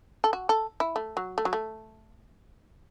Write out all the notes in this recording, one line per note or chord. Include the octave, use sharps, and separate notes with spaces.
A4
F#4
A4
E4
A3
F#3
A3
F#3
A3